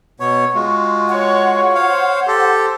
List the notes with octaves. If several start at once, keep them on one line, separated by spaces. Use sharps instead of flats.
B2 B3 C#5 C#6
G#3 F4 F#4
C#5 F#5
C5 C#5 F5
G4 A4